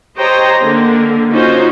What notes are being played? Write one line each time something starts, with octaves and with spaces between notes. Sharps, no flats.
G4 C5 C#5 D#5 G5 A#5
D3 A#3
C#4 D#4 F4 F#4 C5